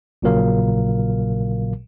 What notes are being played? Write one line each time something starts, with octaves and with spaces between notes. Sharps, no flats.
A#1 A#2 C#3 F#3 A#4 F5